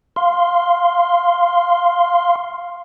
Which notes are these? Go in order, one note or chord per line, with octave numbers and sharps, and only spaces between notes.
F5 C6